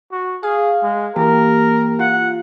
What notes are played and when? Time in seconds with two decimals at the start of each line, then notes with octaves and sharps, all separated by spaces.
0.12 F#4
0.43 G#4 F5
0.83 G#3
1.16 E3 A#3 G4 A#4
1.99 F4 F#5